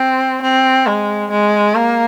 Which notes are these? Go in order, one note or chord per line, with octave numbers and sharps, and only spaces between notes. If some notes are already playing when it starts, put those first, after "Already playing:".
Already playing: C4
C4
G#3
G#3
A#3